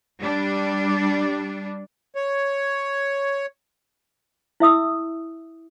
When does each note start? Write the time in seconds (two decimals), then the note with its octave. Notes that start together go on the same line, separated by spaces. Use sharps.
0.20 G3 D4
2.15 C#5
4.60 E4 E5 D#6 E6